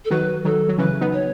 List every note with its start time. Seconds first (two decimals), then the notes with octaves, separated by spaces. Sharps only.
0.05 A4
0.10 D#3 F#3 B4
0.45 D#3 F#3 A4
0.69 F#3
0.78 C#3 E3 B4
1.01 B3 D#4
1.13 C#5